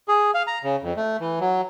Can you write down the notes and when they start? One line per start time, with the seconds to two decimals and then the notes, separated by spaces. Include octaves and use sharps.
0.08 G#4
0.34 F5
0.47 A#5
0.64 C#3
0.82 F2
0.96 A3
1.20 E3
1.40 F#3